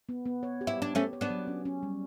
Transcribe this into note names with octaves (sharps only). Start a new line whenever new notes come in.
B3
B3
C#5
G4
E4
D4 G4
A3 C#4 G4
C#5
B3 D4
F#3
C#4
C#4
G3